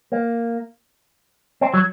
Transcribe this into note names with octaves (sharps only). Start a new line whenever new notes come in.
A#3
C4
F#3